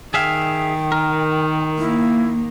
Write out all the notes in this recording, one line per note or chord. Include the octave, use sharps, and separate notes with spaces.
D#3 G#4 E5 F5 G5
A#4
A#3 E4